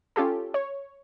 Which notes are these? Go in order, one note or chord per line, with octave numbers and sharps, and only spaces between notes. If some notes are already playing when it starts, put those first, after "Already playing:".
C#4 F4 G4 A4
C#5